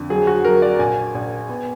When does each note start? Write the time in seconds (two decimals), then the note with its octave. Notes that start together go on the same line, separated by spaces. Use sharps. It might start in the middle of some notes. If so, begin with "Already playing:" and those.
Already playing: F2 D3
0.10 F#3 G#4
0.27 F#4
0.45 F#3 A#4
0.62 D5
0.79 A#1 G#5
1.15 A#1
1.49 B3